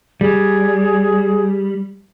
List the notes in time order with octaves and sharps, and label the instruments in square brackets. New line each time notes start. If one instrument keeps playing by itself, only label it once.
[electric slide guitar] G3 [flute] G#4